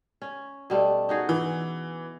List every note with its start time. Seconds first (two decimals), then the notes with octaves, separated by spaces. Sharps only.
0.22 C#4
0.70 B2 G3 A3
1.09 D#4 F#4 G#4
1.29 E3